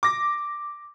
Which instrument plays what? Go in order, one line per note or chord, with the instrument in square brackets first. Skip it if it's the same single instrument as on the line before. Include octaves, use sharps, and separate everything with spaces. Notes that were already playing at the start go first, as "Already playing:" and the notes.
[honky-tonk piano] D6 A#6